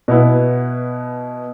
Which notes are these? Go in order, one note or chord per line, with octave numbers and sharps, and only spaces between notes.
B2 B3 E4